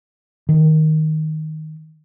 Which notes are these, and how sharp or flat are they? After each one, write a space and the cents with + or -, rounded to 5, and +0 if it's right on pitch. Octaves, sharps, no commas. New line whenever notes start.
D#3 +5